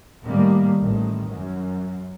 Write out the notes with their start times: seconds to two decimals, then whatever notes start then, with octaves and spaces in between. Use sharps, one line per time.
0.25 A2 D#3 G3 A#3
0.79 A1 D#3
1.29 F#2